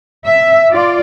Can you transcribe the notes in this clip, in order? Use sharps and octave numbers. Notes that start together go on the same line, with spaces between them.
E5
F4 D5